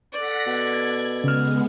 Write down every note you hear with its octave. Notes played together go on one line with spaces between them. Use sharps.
A4 D5 F#5 A#6 B6
B2 G#6
C#3 G#3 B3 F6